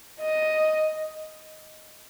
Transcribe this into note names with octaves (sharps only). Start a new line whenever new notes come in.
D#5